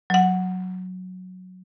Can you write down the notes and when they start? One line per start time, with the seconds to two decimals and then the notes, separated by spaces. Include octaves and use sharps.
0.10 F#3 F#5